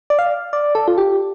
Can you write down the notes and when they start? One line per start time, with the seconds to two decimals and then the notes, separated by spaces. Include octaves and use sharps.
0.10 D5
0.19 F5
0.53 D5
0.75 A4
0.88 F4
0.98 G4